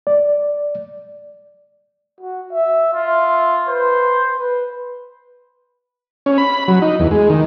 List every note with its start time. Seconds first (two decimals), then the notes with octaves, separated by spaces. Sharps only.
0.07 D5
2.20 F#4
2.52 E5
2.94 F4 E5
3.68 B4 C5
4.37 B4
6.26 C#4
6.38 B5
6.68 F#3
6.82 D#4
6.99 E2
7.11 G#3
7.30 D#3